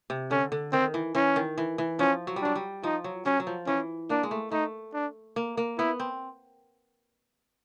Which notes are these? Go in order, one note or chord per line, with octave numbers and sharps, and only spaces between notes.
C3
D3 C#4
D3
D#3 C4
E3
E3 C#4
D#3
E3
E3
F3 C#4
F#3
G3
F#3 D4
G3
F3 D#4
F#3
F#3 C#4
F#3
F3
E3 C#4
A#3 D4
G#3
A3
A3 D#4
D4
A#3
A#3
B3 E4
C4